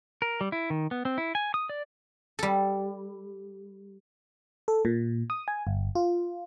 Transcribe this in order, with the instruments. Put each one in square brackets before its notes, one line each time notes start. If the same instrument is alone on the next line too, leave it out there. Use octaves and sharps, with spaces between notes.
[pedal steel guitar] A#4
G3
E4
D#3
B3
C4
E4
G#5
D#6
D5
[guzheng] G3 A4
[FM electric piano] A4
A#2
D#6
G#5
G1
F4